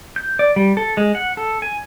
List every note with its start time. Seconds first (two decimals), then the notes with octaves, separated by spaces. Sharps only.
0.16 G6
0.39 D5
0.56 G3
0.77 A4
0.97 G#3
1.15 F#5
1.37 A4
1.62 G#5